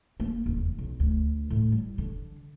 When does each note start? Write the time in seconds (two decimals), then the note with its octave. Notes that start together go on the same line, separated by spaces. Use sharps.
0.20 A#3
0.46 D#1
0.59 E2
0.78 B1
1.00 D2
1.50 A2
1.72 G3
1.98 D3